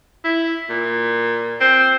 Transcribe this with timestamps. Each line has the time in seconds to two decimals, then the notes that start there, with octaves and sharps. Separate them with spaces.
0.24 E4
0.69 A#2
1.60 C4